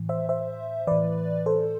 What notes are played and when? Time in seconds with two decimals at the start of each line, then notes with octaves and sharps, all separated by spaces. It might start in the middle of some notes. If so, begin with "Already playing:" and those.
Already playing: A2 E3
0.09 C5 E5
0.29 C5 E5
0.87 A2 E3 B4 D5
1.46 A4 C5